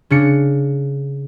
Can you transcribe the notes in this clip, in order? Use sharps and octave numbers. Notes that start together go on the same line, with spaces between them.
C#3 D4 C#7